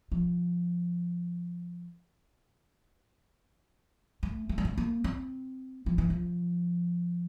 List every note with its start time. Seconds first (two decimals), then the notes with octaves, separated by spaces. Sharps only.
0.12 F3
4.23 A3
4.49 A3
4.58 G3
4.65 A3
4.77 A#3
5.04 C4
5.86 F3
5.98 E3
6.10 F3